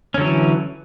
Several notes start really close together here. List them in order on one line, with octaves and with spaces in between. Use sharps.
C#4 D3 F#3 E3